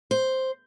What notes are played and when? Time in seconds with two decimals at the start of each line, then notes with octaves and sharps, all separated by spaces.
0.11 C5